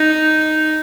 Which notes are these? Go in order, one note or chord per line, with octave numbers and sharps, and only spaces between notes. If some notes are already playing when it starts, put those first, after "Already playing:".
Already playing: D#4